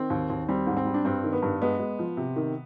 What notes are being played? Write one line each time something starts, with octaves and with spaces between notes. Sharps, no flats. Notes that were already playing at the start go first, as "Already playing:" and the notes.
Already playing: D#3 C4
D#2
D#2
G3 C4
G#2
C4
G3
D4
G2 C4
D#3
B3
G2
G#3 B3
G#3
F3
C3
D#3